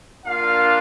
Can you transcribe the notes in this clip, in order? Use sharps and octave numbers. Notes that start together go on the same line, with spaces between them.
A#3 D4 F4 F5